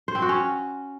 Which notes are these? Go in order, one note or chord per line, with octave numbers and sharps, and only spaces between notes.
C5
C4
F#4
C#4